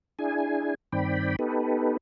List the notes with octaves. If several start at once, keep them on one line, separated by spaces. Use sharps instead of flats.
D4 E4 G#4 G#5
G2 D#3 C4 D5 G5 B5
B3 D#4 G4 A4 B4